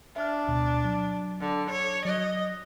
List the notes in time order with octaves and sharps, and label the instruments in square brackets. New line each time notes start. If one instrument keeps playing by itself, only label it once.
[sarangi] D4 [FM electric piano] E5 F6
[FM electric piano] D2 B2
F#3
[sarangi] D3
C#5
[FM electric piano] F#3 F#6 [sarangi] D#5